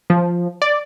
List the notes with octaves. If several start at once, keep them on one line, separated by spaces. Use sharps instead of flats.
F3
D5